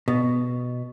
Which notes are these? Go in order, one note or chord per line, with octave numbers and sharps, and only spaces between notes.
B2